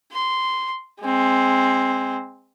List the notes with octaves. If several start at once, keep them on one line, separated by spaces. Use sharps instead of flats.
C6
G#3 C4